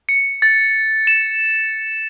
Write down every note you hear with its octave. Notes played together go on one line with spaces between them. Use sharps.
C#7
A6
E7